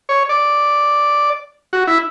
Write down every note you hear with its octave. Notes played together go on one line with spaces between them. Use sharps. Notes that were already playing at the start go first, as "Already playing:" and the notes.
C#5
D5
F#4
E4